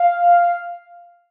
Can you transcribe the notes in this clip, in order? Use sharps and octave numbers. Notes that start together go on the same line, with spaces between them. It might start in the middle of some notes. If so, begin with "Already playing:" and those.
Already playing: F5